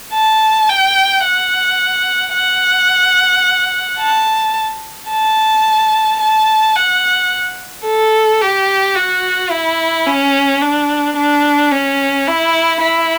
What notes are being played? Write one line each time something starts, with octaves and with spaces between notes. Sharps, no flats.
A5
G5
F#5
F#5
A5
A5
A5
F#5
A4
G4
F#4
E4
C#4
D4
D4
C#4
E4
E4